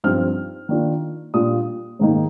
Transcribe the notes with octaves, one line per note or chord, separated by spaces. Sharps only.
G2 F3 C4 D#4 F6
D#3 A#3 D4 F4
A#2 G3 D4 F4 D#6
G#2 D#3 A#3 D#4